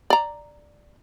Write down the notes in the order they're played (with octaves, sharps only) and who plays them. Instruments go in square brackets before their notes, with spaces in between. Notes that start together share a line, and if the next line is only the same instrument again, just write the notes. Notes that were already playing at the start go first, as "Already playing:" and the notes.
[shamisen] D5 A#5